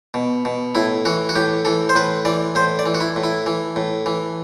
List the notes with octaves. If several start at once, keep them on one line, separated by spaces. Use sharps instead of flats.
B2
B2
A2 E4
E3 F#4
F#4
A2 G4
E3 A4
C5
A2 B4
E3 D5
A2 C5
D5
E3
F#4
E4
A2
E4
E3
A2
E3